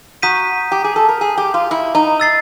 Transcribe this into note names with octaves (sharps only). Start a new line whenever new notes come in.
F#4 A#5 D#6 G6 B6 D#7
G4
G#4
A4
A#4
G#4
G4
F4
E4
D#4
E6 A6 C7